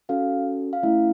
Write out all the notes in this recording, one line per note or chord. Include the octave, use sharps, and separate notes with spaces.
C#4 F#4 A4 F5
F5
A3 C#4 E4 E5